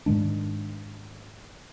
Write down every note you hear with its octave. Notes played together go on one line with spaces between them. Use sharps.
G#2 D#3 G#3 D4